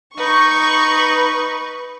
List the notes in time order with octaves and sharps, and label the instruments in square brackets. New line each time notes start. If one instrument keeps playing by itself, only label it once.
[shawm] D#4 [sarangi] B4 [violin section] C#6